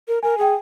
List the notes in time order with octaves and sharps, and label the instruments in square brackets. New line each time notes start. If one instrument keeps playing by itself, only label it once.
[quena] A#4
[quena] A#4 [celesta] G#5
[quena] G#4 [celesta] G5